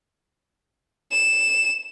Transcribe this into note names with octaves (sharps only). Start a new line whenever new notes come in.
E7